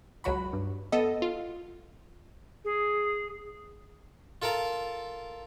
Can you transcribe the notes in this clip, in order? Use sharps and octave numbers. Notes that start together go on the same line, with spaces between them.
C#2 F#3 F#4 B5
G2
B3 A4 D#5
F4
G#4
F4 A4 A#4 F5